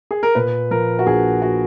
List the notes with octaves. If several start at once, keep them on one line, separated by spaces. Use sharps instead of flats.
G#4
A#4
A#2 B4
F3 A#4
F#4
A#1 G#4
F#4